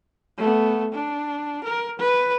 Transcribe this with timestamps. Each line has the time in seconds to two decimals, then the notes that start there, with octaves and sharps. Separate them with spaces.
0.38 A3 B3
0.93 D4
1.64 A#4
1.99 B4